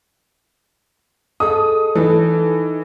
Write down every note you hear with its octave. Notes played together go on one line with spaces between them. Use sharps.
G#4 A4 D#5 D#6
E3 D#4 A4